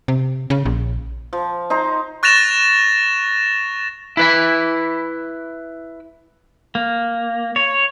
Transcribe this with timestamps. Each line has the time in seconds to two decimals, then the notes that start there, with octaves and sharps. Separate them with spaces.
0.08 C3
0.50 C#3
0.66 A#1
1.33 F3
1.70 D#4 C5 A#5
2.23 C#6 F#6 A6 A#6 E7 F7
4.17 E4 B4 B5
6.75 A#3
7.56 C#5